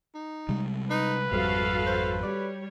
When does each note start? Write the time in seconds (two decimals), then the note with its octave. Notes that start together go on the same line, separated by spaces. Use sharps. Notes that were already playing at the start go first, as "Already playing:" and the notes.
0.15 D#4
0.49 C3 G3 G#3
0.90 D#4 B4
1.32 G#1 F2 C3 G3 F#4 A4 F5
1.87 C5
2.23 G3 C#5 D5